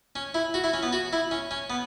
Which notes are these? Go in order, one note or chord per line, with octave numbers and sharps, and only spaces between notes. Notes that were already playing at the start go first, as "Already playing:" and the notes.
C#4
E4
F#4
E4
C#4
B3
F#4
E4
C#4
C#4
B3